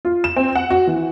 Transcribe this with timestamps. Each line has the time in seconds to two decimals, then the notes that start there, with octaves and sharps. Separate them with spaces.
0.05 F4
0.24 E7
0.37 C4
0.55 F#5
0.71 F#4
0.87 E3